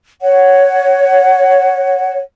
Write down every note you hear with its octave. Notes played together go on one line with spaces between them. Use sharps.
C#5 F#5